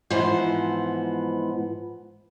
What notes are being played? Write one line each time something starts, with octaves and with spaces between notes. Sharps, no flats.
G#2 E3 F3 B3 C5